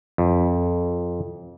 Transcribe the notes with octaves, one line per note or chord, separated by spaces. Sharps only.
F2